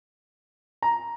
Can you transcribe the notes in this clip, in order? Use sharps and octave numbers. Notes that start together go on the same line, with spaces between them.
A#5